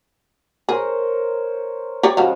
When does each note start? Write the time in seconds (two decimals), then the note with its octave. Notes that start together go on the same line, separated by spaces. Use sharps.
0.69 G#4 A#4 C5 C#5
2.03 G4 C#5 D5
2.17 C#3 F3 G3 G#3 F#4 F5